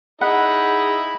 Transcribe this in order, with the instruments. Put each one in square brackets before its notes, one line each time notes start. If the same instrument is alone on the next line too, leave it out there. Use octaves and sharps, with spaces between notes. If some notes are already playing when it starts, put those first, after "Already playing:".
[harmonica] D#4 E4 D#5 [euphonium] G#4 [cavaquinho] F#5 [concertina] B5